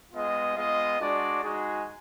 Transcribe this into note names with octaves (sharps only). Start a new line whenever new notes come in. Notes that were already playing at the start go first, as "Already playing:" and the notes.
G#3 B3 F4 D#5
G#3 B3 F4 D#5
G#3 D4 F#4 D5
G#3 D#4 F#4 G#4